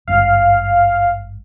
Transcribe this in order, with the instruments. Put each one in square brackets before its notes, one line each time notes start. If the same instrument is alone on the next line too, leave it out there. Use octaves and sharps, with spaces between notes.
[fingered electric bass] G#1 G2 [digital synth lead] F5